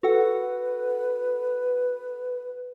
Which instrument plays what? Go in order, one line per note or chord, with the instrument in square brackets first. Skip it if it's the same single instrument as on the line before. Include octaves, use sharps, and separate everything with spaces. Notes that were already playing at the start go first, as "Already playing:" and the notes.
[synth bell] F#4 A4 F#5 [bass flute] B4